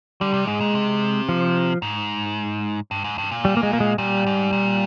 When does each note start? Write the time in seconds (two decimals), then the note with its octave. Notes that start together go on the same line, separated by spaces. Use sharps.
0.21 D3 G3
0.34 C3
0.47 G#2 G#3
0.60 A#2
0.75 C3
1.29 F3
1.82 G#2
2.91 G2
3.04 G#2
3.18 G2
3.31 A#2
3.45 G3
3.57 A#3
3.63 G#3
3.73 A#3
3.80 G#3
3.98 A#2 G3
4.26 G#2
4.53 A#2